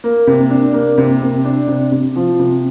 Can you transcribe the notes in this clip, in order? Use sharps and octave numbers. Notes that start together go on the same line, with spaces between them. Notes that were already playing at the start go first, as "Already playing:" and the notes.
A#3
C3
D4
A#3
C3
C3
D4
C3
C3
F3
C3